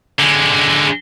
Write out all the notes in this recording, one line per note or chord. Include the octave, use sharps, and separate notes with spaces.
D3 G#3